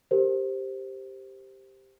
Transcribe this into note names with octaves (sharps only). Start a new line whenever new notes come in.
G4 A#4 C5